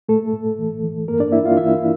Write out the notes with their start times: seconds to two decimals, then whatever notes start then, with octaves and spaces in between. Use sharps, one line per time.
0.09 A2 A3 A4
0.33 A2
0.59 E3
0.84 E3
1.08 G2 A#3 A#4
1.20 D4 D5
1.32 G2 E4 E5
1.45 F4 F5
1.57 E3 E4 E5